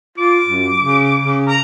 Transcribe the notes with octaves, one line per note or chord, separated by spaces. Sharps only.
F4 D6
F#2
C#3
C#3
A#5